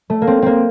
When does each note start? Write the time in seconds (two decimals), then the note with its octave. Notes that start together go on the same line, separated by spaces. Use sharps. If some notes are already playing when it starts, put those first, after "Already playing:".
0.10 A3
0.22 A#3
0.27 C4
0.42 A#3 C4